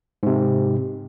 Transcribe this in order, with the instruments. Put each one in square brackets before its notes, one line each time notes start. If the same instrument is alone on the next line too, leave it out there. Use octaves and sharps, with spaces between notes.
[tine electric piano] G#2 C3